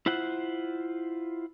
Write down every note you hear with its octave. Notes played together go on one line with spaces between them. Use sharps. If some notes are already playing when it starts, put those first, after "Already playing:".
E4 F4 C5 F#5